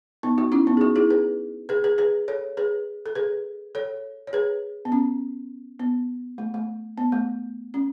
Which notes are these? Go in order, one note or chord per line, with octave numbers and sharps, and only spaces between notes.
B3 D#4
D#4 F#4
C#4 E4
B3 D#4
G#4
D#4 F#4
E4 G#4
G#4 B4
G#4 B4
G#4 B4
G#4 B4
A4 C#5
G#4 B4
A4
G#4 B4
A4 C#5
C#5
G#4 B4
B3
C#4
B3
A3
A3
B3
A3
C#4